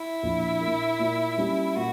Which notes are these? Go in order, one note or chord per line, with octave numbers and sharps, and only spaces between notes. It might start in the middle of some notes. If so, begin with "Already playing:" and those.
Already playing: E4
A#1
A#2 A#3
A#2
G3 C#4 G4
A#2 F#4